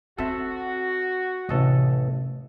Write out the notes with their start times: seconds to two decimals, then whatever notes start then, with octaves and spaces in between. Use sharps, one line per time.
0.18 C4 F#4 A4 C5 E5
1.49 A1 C3 A4 D#5